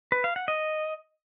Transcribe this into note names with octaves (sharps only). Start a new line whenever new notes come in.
B4
F5
F#5
D#5